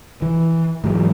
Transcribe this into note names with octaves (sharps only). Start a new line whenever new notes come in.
E3
G#2 E3 F#3 G#3